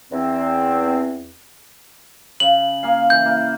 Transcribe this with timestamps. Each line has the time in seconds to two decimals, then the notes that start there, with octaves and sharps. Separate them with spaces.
0.11 E2 C4
2.40 C#3 F#7
2.83 A#3 G#4 F5
3.10 E3 G6
3.26 A#3